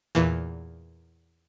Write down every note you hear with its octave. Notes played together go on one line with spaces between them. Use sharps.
E2 A#2 E3